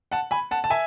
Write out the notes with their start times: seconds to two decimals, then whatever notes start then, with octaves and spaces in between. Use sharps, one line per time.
0.12 F#5 A5
0.31 G#5 B5
0.51 F#5 A5
0.64 A5
0.70 E5 G#5